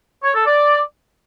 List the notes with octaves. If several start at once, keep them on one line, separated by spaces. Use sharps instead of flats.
C#5
A4
D5